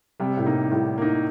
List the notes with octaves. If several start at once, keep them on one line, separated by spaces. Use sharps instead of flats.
C3 G3
A2
A#3 D#4
A2 G3
A#3 D#4